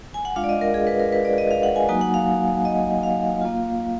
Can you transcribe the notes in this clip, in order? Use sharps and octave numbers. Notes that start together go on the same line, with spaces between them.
G#5
F#5
G#3 D4 F4 F5
D5
D#5
A#4
G#4
B4
A#4
B4
D5
D#5
F5
F#5
G#5
F#3 A#3 D#4 F#4 G#5
F#5
F5
D#5
F5
A#3 F4